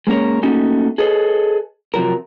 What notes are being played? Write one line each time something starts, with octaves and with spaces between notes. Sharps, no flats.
G#3 A#3 C#4 A#4 C#5
A3 A#3 C#4 D#4 F#4
G#4 A4 B4 C#5 D#5
C3 F3 F#3 A#4